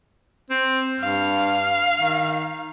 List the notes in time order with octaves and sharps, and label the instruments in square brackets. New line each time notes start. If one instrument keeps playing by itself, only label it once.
[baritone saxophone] C4
[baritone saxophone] G2 [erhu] F5
[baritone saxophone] D#3